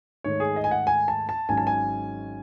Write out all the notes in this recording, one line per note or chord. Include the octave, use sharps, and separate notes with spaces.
G#2 D#3 A3 C#5
G#4
D#5
G#5
F#5
G#5
A5
A5
G#1 G#2 F#3 C#4 G#5
A5
G#5